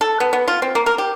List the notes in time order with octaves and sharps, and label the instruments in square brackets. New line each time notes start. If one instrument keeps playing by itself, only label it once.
[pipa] A4
B3
B3
F4
C4
A#3
A#4
G4